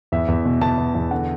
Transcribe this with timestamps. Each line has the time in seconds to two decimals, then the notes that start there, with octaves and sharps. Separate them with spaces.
0.12 E2 E5
0.28 E2
0.45 B2
0.61 B2 A5
0.78 B2
0.95 E2
1.11 D3 F#5